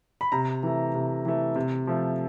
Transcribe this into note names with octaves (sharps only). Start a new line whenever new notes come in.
B5
C3 A#5
E3 A3
C3
E3 A3
C3
F3 A3